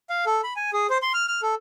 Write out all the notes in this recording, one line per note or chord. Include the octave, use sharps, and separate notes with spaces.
F5
A4
B5
G#5
G#4
C5
C6
F6
F6
A4